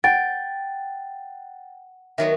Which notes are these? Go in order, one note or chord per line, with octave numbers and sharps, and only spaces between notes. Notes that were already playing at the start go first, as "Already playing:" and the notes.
F#5 G5 A6
D#3 F#3 B3 E5